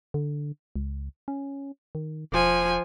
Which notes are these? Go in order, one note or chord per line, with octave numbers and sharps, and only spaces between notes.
D3
C#2
C#4
D#3
E1 F3 G#5